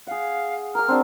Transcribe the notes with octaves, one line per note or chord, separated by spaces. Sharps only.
G#4 F5 F#5
A#4 D6 F6
C4 D4 F#4